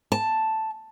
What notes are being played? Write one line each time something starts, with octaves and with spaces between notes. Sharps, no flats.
A5